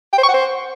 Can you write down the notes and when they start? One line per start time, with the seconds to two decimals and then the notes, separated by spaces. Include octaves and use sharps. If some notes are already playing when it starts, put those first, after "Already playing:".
0.13 G5
0.18 C5
0.23 C#6
0.28 F#5
0.34 C5